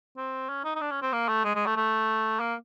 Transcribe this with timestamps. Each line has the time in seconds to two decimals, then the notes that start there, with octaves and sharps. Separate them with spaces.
0.17 C4
0.49 C#4
0.64 D#4
0.75 D#4
0.81 D4
0.91 C#4
1.02 C4
1.12 A#3
1.28 A3
1.44 G#3
1.55 G#3
1.66 A3
1.76 A3
2.40 A#3